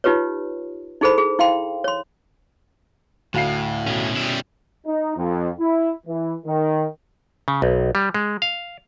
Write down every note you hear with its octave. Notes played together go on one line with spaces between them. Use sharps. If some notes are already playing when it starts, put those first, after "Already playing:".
D#4 F4 G4 B4 C#5
D#4 E4 G#4 A4 C5 B5
G#4
E4 F5 G5 C6
C#5 C6
D2 A2 F5 C7
B2 C#4
G3 E4
D#4
F2
E4
E3
D#3
C#3
B1
G3
G#3
F5